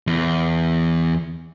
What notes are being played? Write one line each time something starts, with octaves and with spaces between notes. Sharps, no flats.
E2